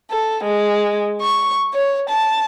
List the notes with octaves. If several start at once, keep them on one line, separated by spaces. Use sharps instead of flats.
A4
G#3
C#6
C#5
A5